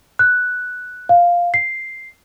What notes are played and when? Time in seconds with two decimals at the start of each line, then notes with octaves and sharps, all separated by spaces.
0.19 F#6
1.09 F5
1.54 C7